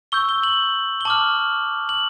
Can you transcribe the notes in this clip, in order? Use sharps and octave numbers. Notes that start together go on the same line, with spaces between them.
C#6 E6 G6 G7
G7
F#7
G7
A5 D6 F6 F#7
F#7